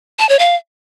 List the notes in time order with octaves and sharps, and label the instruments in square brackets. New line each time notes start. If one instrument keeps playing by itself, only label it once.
[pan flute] A5
C#5
F5